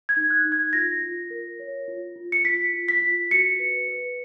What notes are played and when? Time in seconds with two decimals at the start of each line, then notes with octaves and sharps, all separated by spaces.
0.09 G#6
0.17 D#4
0.30 F#6
0.45 D#4
0.52 G#6
0.73 F4 A#6
1.02 F4
1.30 A#4
1.60 C#5
1.88 F4
2.16 F4
2.32 C#7
2.45 F4 B6
2.73 F4
2.88 B6
3.02 F4
3.31 F#4 C#7
3.59 B4
3.88 B4